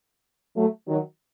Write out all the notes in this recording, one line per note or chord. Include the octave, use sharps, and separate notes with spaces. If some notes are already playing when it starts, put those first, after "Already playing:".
F#3 A3
D#3 F#3